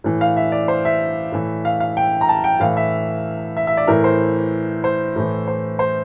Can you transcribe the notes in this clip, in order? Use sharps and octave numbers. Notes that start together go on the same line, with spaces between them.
A2 E3
F5
E5
D5
C5
E5
A2 E3
F5
F5
G5
A#5
A5
G5
A2 E3 F5
E5
E5
E5
D5
A2 E3 A#4
C5
C5
A2 E3
C5
C5